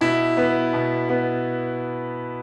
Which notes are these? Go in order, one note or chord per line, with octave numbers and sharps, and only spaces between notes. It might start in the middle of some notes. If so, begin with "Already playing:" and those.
B2 E4
B3
B2
B3